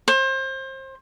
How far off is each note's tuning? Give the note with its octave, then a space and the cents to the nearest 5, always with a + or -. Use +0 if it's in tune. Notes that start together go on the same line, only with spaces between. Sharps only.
C5 +30